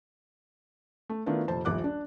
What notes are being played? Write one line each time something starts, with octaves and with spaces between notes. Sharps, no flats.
A3
D#3 A3 B3 D4 E4 F4
F1 A#2 C5 A5
D#1 A#1 F3 D6 F#6
D4